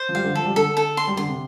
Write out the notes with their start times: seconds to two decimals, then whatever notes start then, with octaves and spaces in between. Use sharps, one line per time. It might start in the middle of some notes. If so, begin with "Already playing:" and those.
Already playing: C5
0.09 F3
0.15 G3 F5
0.24 D3
0.35 F3 A4
0.46 G3
0.56 D3 A4
0.77 A4
0.97 C6
1.07 G3
1.17 D3 C6
1.28 C3